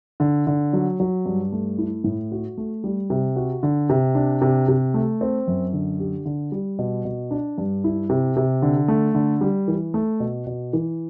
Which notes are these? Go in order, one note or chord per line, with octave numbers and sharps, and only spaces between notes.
D3
D3
F#3
F#3
G2
A3
E4
A2
F#4
A3
G3
C3
F#4
D3
C3
D4
C3
C3
A3
C4
F#2
D3
G4
D3
G3
B2
B2
D4
G2
E4
C3
C3
D3
A3
D3
G3
E3
A3
B2
B2
E3